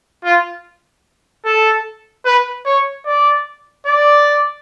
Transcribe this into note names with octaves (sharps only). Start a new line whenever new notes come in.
F4
A4
B4
C#5
D5
D5